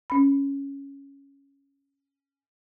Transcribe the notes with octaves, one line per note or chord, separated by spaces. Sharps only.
C#4 B5